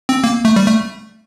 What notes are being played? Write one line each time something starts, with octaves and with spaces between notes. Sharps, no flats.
C4
A#3
A3
G3
A3